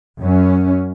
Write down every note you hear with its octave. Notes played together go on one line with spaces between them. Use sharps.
F#2 C#4